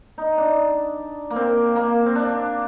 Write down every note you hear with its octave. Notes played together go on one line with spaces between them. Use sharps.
D#4
D4
A#3
C4
A#3
C4
D4